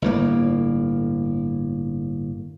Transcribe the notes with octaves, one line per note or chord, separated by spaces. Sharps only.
G1 A2 A#3